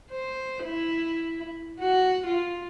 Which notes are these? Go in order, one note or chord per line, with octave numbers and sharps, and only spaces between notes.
C5
E4
F#4
F4